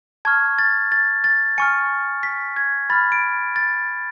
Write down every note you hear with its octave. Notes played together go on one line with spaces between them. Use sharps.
A5 C#6 F6 G#6
A6
A6
A6
G#5 C#6 F6 C#7
B6
G#6
B5 F6 A6
D7
A6